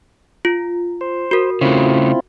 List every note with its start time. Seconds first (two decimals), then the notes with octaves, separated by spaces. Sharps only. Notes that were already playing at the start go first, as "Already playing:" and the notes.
0.45 F4
1.01 C5
1.31 F#4 A#4
1.61 C#3 A3 C4 E4 F4